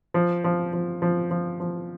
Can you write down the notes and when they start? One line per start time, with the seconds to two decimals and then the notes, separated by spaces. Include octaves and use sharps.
0.14 F3
0.44 F3
0.73 F3
1.02 F3
1.31 F3
1.60 F3